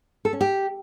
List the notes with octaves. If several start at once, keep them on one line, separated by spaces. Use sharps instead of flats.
A4
C#4
G4